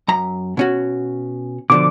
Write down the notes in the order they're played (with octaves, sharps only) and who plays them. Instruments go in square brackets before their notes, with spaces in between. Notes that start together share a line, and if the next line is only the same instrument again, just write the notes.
[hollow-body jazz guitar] F#2 A#5
B2 C#4 F#4
[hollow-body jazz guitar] B2 D3 F3 [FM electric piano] D6